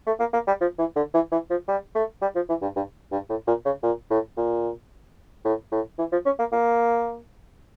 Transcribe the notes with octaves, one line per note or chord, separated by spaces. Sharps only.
A3
A#3
A#3
G3
F3
E3
D3
E3
E3
F3
G3
A3
G3
F3
E3
G2
G2
G2
A2
A#2
C#3
A#2
A2
A#2
A2
A2
E3
F3
C#4
A#3
A#3